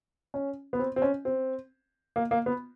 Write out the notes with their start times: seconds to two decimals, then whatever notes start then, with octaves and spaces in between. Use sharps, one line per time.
0.34 C#4
0.73 B3
0.79 C4
0.96 C4
1.02 C#4
1.25 C4
2.16 A#3
2.31 A#3
2.46 B3